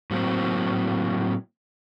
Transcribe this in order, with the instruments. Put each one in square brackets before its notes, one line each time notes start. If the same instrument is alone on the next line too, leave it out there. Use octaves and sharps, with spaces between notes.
[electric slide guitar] A2 F#3 A#3 C4